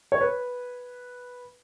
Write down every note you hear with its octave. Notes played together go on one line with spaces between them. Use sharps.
C#5
B4